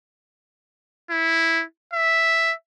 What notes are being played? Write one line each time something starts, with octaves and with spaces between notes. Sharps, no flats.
E4
E5